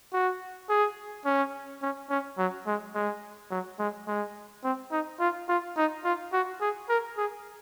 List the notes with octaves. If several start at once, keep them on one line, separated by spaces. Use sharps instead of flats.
F#4
G#4
C#4
C#4
C#4
F#3
G#3
G#3
F#3
G#3
G#3
C4
D#4
F4
F4
D#4
F4
F#4
G#4
A#4
G#4